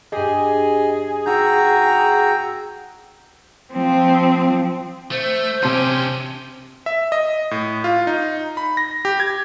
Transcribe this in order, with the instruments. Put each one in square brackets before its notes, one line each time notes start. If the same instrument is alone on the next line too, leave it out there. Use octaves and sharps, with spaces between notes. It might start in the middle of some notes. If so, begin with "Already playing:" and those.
[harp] G2 G4 [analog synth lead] G#4 [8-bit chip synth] D#5 G#5
[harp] D#4 [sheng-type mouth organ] F#4 A#5 [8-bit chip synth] G5 E6 G6
[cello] F3 C4
[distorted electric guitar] A3 [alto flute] C5
[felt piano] C3 A5 C6 [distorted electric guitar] C#4 G4
[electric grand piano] E5
D#5
A2
F4
D#4
B5
A#6
G4
G#6